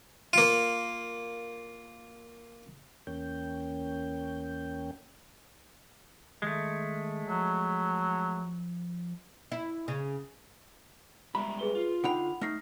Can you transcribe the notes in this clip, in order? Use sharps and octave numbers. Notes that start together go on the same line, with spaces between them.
A#3 F4
E2 A#3 C#4 G5
D#3 G#3 A3
F3 F#3
E4
C#3
G3 G#3 E5 A#5 B5
G#4 B4 G7
F4
D3 D#4 F#5 G5 B5 F7
A3 D#4 F6 A#6 C7